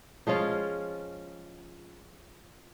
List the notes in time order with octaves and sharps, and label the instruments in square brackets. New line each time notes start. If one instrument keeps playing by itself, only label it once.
[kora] F3 G#3 C#4 F4